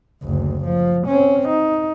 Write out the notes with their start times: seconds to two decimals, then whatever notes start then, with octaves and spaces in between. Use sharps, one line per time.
0.23 F#1 D2
0.65 F3
1.07 C4 C#4
1.49 D#4